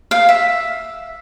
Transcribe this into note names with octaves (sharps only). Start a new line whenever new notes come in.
F5
E5